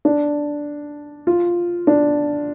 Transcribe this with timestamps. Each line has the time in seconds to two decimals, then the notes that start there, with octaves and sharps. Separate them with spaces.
0.05 D4
1.27 F4
1.87 D4